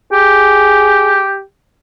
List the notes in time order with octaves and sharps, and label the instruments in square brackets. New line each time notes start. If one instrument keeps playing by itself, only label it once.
[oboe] G4 [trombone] G#4